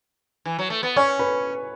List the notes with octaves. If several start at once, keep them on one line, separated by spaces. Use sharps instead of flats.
E3
F#3
A3
B3
C#4 C#5 C#6
B4 B5